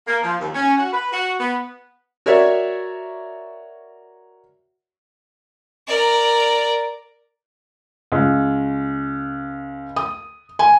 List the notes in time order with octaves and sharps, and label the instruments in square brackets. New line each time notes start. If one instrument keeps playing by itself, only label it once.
[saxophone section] A#3
F3
D#2
C#4
F#4
B4
F#4
B3
[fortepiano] F#4 A#4 C#5 D5 E5
[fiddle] A#4 D5
[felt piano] C#2
D#6
G#5